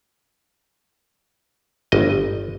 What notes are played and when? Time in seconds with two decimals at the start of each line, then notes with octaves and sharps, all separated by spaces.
1.92 G1 D#5